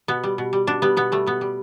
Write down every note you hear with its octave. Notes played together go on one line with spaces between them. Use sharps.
B2 B3
G3
B2
G3
B2 D4
G3 B3
B2 B3
G3 A3
B2 B3
G3